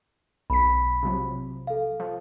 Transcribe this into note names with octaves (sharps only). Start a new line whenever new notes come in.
B1 B5 B6
C3 F3 F#3
A4 F5
F3